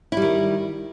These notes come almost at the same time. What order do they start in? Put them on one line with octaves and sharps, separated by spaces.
E4 G3 D#3